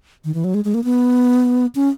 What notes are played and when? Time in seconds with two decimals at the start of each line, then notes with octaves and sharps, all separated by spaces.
0.25 D#3
0.34 E3
0.44 F#3
0.54 G#3
0.65 G#3
0.74 A#3
0.84 B3
1.75 C#4